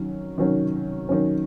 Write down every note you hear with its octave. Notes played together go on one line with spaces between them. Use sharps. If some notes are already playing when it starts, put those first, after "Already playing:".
Already playing: D#3 F#3 C#4
D#3 F#3 C#4
D#3 F#3 C#4